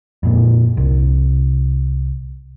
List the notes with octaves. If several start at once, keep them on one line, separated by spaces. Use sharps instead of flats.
F2 A#2
C2